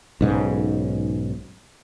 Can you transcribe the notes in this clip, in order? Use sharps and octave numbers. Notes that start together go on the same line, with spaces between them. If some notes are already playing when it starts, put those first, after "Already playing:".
B1 G#2 C#3